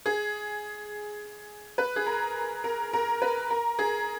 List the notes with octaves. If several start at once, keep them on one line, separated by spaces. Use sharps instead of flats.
G#4
B4
G#4
A#4
A#4
A#4
B4
A#4
G#4